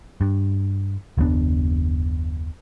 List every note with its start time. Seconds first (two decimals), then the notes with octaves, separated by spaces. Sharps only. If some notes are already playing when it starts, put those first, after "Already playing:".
0.21 G2
1.18 F#1 D#2 B3 D4